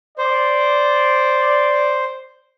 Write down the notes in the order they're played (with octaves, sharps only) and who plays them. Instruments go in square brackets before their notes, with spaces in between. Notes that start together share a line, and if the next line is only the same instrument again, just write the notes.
[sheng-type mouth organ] C5 [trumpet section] D5